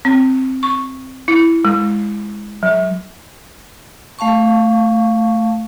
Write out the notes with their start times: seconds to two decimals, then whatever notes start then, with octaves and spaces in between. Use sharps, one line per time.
0.05 C4
0.63 C#6
1.28 E4
1.65 G#3
2.63 F#3
4.19 A3 F5 A5 C#6